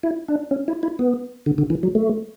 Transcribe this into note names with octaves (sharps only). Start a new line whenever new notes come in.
E4
D4
C#4
E4
E4
B3
D3
D3
E3
F#3
A3